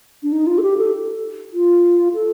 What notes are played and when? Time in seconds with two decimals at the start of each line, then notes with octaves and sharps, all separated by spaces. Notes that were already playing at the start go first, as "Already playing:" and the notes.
0.23 D4
0.32 D#4
0.47 F4
0.58 A4
0.63 G4
0.78 A4
1.54 F4
2.14 A4